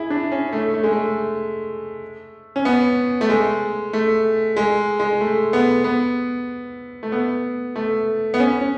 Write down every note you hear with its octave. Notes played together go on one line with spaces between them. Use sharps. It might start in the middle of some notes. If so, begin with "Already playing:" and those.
Already playing: E4 G#4
D4
C#4
A3
A3
G#3
A3
C#4
B3
A3
G#3
A3
G#3
G#3
A3
B3
B3
A3
B3
A3
B3
C#4
C#4